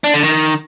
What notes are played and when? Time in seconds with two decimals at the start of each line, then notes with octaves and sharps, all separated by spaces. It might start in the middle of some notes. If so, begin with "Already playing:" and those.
0.04 D4
0.14 D3
0.23 D#3